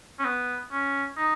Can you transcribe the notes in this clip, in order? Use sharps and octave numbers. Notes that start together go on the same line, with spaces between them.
C#4
B3
C#4
D#4